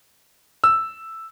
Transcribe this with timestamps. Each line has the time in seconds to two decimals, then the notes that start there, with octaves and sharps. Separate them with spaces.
0.64 E6